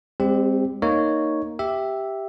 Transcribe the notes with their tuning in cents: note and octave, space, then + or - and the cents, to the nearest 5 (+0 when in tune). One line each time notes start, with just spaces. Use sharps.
G#3 -45 C4 +0 G4 +0
A#3 +0 D#4 +0 C#5 +0
G4 +0 E5 +0